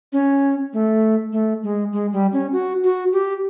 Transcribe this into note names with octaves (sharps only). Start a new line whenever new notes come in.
C#4
A3
A3
G#3
G#3
G3
C#4
F#4
F#4
G4